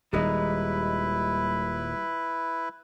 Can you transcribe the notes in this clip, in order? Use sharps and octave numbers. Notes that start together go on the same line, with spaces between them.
D#1 D#2 G3 G#3 D#4 E4 B4